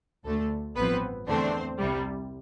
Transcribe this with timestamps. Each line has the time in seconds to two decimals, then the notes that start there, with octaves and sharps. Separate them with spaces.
0.25 D2 D3 A3 A4
0.76 A1 G2 F3 B3 C4 B4
1.27 E2 D3 A3 C4 D4 C5
1.78 C2 C3 G3